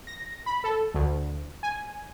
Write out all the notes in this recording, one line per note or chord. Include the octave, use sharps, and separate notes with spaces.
A#6
B5
A4
D2
G#5